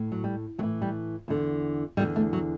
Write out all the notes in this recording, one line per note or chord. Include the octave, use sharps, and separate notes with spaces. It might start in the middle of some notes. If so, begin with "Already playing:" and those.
Already playing: A2
F#3
G3
A2 E3 F#3
G3
E2 D3
E2 D3 G3
A3
F#3